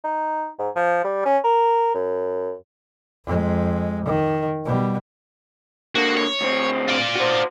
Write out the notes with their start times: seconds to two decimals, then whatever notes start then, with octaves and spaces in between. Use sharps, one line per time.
0.04 D#4
0.59 G#2
0.76 F3
1.04 G3
1.25 C#4
1.44 A#4
1.95 F#2
3.25 F2 G#3
4.05 D#3
4.65 B2 G3
5.95 D3 A#3 F#4
6.17 C#5
6.41 D2 C4
6.88 F4 D5
7.15 F#4 C5